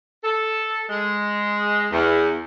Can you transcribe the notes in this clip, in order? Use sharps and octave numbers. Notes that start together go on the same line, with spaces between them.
A4
G#3
E2